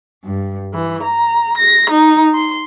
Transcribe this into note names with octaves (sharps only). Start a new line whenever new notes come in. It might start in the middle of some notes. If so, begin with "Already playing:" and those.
G2
E3
A#5
A#6
D#4
C6